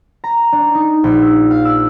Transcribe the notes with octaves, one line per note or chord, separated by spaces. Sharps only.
A#5
D4
D#4
A#1
E6
F5
E6